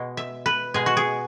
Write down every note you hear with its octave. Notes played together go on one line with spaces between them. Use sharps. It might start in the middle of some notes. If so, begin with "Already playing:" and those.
Already playing: B2 G#3
E5
B4
B2 G#3 G#4
F#4
G#4